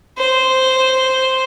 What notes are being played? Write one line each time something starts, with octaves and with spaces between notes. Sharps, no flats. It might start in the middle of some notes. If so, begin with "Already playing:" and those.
C5